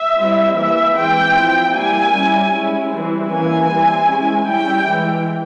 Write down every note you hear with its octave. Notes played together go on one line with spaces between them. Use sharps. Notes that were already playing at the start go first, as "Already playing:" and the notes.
Already playing: E5
G3 C4 E4
E3 A#3 E4 E5
E3 G#3 C4 G5
F3 C4 E4
G3 A#3 E4 G#5
G3 C#4 E4
G#3 C#4 E4
E3 G3 C4 E4
E3 A#3 C#4 E4 G#5
G3 C4 E4
G#3 C#4 E4
G3 C#4 E4 G5
E3 G#3 E4